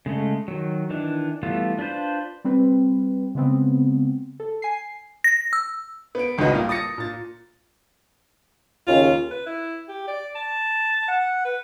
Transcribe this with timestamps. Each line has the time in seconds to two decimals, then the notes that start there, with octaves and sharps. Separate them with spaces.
0.06 C#3 G#3 A3
0.48 D#3 F#3
0.90 D#3 E3 D4
1.43 E3 G3 A3 B3 F4
1.79 D4 F4 B4 C5
2.44 G3 C4 B4
3.35 C#3 G#3 B3 C4
4.40 A4
4.62 G#5 C7
5.24 A#6
5.53 E6
6.15 B3 D7
6.38 G#1 C#2 D#3 F#4 B4 D#5
6.51 A#2 G3 A#3
6.69 D#6 A6 A#6 C#7
6.98 A#2 A6
8.87 D#2 C#3 F4
9.31 B4
9.46 E4
9.89 G4
10.08 D5
10.35 A5
11.08 F#5
11.45 B4